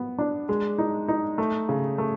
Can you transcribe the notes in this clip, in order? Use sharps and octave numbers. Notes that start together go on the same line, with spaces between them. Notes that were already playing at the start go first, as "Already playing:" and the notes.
Already playing: B3
D4
G#3
D#4
D#4
A3
C#3
A3